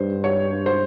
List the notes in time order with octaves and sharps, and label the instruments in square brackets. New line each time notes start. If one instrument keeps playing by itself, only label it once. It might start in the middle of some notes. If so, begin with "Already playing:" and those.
Already playing: [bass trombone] G2 [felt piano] C5
[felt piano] C#5
C5